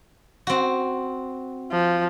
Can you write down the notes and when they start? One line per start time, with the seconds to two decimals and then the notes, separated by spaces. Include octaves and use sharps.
0.47 C4 F#4
1.71 F3